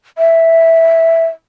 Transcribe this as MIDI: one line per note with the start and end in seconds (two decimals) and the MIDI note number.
0.18 1.26 76